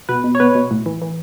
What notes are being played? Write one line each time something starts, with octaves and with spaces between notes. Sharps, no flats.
B2 B4
B2
C#5
B2 B4
B2
A2
E3
E3